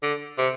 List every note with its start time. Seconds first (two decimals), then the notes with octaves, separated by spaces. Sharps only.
0.03 D3
0.38 C3